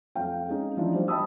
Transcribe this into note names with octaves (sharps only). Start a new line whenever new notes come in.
F2 F5 G5
G#3 C#4 D#4
E3 F3 D4 D#4
G3 C5
D#5 G5 A5 B5 D#6 E6